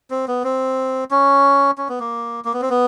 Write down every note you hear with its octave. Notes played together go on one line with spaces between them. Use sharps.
C4
B3
C4
C#4
C#4
B3
A#3
A#3
B3
C4
B3